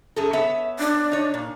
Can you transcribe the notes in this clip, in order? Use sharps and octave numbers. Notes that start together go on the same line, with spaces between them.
F#2 G#4 A4
B3 C#5 E5
D4
D#4 C#5
A#2